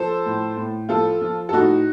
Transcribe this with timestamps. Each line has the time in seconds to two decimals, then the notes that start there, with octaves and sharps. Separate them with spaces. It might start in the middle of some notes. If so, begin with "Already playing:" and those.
Already playing: F3 A4 C5
0.26 A2
0.57 A2
0.89 F3 F4 A4
1.21 F3
1.49 A4
1.53 A2 D#4 F#4